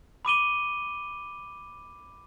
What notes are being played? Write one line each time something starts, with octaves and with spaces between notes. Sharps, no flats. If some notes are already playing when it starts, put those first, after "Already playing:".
B5 D6 D#7 G7